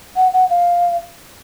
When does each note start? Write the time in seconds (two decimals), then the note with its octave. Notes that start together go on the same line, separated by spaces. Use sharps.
0.16 F#5
0.33 F#5
0.50 F5